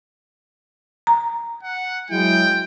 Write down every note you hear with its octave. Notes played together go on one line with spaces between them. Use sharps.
A#5
F#5
F#3 G#3 E4 G5